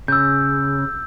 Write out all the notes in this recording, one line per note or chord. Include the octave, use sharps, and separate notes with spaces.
C#3 E6 G6